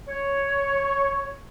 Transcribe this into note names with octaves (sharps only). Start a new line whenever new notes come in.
C#5